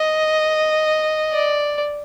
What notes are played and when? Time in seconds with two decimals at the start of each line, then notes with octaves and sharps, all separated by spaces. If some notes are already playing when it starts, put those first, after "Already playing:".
Already playing: D#5
1.33 D5